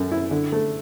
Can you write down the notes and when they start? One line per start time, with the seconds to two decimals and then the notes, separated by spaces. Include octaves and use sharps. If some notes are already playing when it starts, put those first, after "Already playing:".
Already playing: F#2 A3
0.11 E4
0.31 D3
0.52 A3